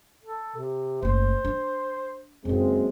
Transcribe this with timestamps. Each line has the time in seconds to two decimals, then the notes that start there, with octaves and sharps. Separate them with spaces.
0.24 A4
0.56 C3
1.02 F#1 A3 C5
1.45 D4
2.45 F#1 F#2 C#3 G#3 C4